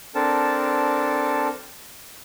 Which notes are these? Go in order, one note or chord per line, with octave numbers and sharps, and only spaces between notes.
C4 D4 A4 A#4 A5